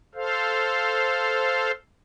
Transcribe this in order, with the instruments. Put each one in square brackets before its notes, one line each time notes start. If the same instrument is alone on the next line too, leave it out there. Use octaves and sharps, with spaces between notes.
[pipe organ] A4 C5 F5